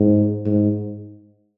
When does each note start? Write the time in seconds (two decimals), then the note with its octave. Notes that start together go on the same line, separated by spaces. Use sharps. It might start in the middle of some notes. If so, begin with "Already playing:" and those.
Already playing: G#2
0.46 G#2